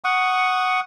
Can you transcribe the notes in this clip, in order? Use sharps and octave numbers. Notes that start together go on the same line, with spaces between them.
F#5 C#6 D#6